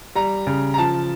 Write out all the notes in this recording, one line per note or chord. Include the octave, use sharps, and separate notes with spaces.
G3 A#5
C#3
A#5
F3 A5